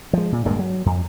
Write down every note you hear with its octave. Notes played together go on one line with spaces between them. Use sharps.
F3 G#3
A#2
D1 G2 G#3 A#3
F#3
F2